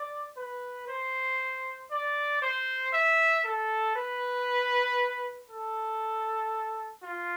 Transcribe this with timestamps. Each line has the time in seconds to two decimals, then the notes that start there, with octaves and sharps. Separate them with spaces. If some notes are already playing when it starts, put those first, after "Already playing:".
Already playing: D5
0.37 B4
0.88 C5
1.91 D5
2.42 C5
2.93 E5
3.45 A4
3.96 B4
5.50 A4
7.04 F4